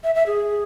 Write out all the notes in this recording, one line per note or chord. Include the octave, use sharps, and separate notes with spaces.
E5
E5
G#4